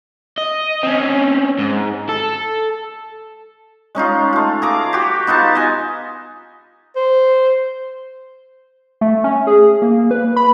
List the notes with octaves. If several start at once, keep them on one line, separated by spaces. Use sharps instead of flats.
D#5
C4 C#4
G#2
A4
G#3 C#4 D#4 F4
A3 F4
G#4 A#5 D6
F#4 G4
B3 D#4 F4 A5
D#5 G#5
C5
A3
C#4
G#4
A#3
B4
B5